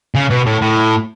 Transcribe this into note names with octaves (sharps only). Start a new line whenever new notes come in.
C#3
B2
A2
A2